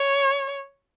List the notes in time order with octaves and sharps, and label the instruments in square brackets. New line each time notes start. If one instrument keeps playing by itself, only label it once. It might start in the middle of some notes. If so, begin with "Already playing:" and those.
Already playing: [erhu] C#5